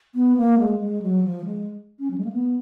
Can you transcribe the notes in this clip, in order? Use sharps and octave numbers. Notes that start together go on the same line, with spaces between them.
B3
A#3
G#3
G#3
F#3
F3
G#3
C#4
F#3
G#3
A#3
B3